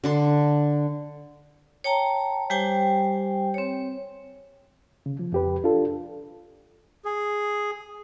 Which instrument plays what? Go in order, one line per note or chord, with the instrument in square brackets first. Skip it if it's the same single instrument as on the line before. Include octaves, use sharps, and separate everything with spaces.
[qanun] D3 D4 C6
[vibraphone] C#5 G5 A5 A#5
G3 G4 C5 G5 G#5
C4 C#5
[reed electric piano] C#3
F3
F2 G4 B4
D4 F4 A4
[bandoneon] G#4